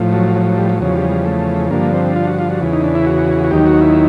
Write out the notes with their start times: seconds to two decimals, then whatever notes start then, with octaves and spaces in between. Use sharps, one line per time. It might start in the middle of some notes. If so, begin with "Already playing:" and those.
Already playing: A2 F3
0.13 F#3
0.35 F#3
0.46 F#3
0.57 G3
0.69 F#3
0.80 E2 C#3 F3 F#3
0.96 G3
1.11 G3
1.25 A3
1.71 G2 D3 F3 A#3
1.93 C4
2.16 F4
2.27 F#4
2.39 F4
2.50 F#4
2.61 E2 C#3 E3
2.73 D#4
2.84 D4
2.95 E4
3.06 F#4
3.44 F#4
3.51 D#2 D#3 F#3 G4
3.66 F#4
3.81 E4